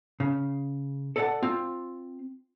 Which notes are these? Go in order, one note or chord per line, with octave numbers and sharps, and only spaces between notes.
C#3
A4 D5 D#5 F5 F#5 A5
C4 F4